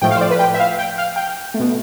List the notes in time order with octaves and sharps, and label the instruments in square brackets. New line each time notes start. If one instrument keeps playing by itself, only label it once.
[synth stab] A2 F3 A3 G5
F5
C5
D5
B4
G5
E5
F5
G5
F5
G5
A3
B2